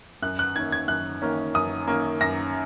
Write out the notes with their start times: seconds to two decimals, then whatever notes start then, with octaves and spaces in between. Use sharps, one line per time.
0.22 F#2 F#6
0.39 F#6
0.56 D#3 A#3 C#4 G#6
0.72 G#6
0.88 F#2 F#6
1.22 D#3 A#3 C#4
1.54 F#2 D#6
1.87 D#3 A#3 C#4
2.20 F#2 A#6